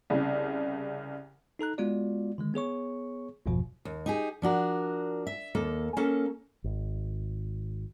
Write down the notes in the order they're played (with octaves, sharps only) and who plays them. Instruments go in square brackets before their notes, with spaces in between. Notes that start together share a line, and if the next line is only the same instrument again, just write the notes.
[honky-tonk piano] C2 C#3
[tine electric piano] D#4 A4 A#5 F#6
G#3 B3 F4 F#4 D5
D3 D#3 G#3
B3 G#4 C#5 C#6
G1 E2 G2 B2 F3
[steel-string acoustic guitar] D#2
D#4 G4 G#4
F3 D4 F#4 A#4
E5
D#2 A#3 A4
A#3 C#4 A4
[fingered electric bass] G#1